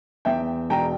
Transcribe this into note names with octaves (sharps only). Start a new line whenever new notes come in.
E2 E5 G5
E1 G5 A#5